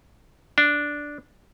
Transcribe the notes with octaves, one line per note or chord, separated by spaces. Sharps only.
D4